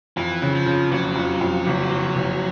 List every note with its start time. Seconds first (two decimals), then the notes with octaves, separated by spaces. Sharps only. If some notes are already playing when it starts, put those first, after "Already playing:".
0.17 F2 E3
0.42 C#3
0.54 F3
0.66 C#3
0.91 F#1 F#3
1.16 F2
1.41 F2
1.67 F#1
1.90 F#1
2.16 F#1